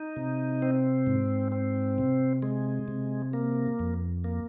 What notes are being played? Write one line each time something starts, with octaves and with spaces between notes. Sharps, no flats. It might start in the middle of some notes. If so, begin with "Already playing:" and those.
Already playing: D#4
C3
C4
G#2
C4
C3
G#3
C3
A#3
F2
A#3